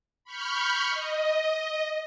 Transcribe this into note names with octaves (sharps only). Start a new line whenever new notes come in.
B5 C#6 F6 G6
D#5